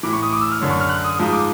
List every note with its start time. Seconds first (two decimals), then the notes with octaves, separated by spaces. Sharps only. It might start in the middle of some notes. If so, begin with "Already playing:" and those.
0.03 A2 E3 D6
0.13 C#6
0.23 D#6
0.33 D6
0.41 E6
0.52 F6
0.61 F#2 D3 F#3
0.70 C#6
0.80 F6
0.90 F#6
1.04 D#6
1.19 G#2 F3 D#6
1.32 D6